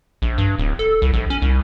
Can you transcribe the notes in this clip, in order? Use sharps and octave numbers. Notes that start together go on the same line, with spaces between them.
A#1
G2
D1
A4
C2
A#1
C#4
C2